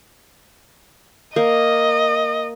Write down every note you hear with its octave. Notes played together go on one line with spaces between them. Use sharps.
A#3 D#5